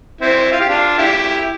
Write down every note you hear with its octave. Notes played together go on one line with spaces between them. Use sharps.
C4 E4
F4
G4
D4 F4
E4 G4